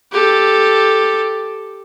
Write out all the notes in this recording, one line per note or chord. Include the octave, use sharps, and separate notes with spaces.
G4 A4